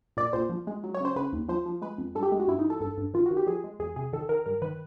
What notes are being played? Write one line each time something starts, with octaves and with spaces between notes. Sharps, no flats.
A#2 D5
A#2 C5
F3
G#3
F#3
C#5
C#3 C5
C#3 B4
D#2
F3 C5
F3
G#3 B4
F2
G2 A4
G4
G#3
F#4
G2 E4
D#4
E3
A4
G2 A4
G2
D#3 F4
F#4
D#3
G4
F3 G#4
G#3
E2 G#4
C3 G#4
D#3 A4
D#3 A#4
G2 A#4
D#3 B4